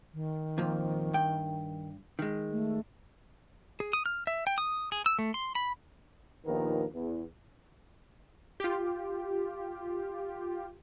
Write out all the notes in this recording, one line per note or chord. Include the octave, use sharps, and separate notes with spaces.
D#3
F2 A#2 F3
G2 G5
D#3 G#3
A3
G#4
D#6
F6
E5
G5
D#6
G#4
E6
A3
C6
B5
A#1 D#2 D#3 F3 B3 A#4
E2
F4 G4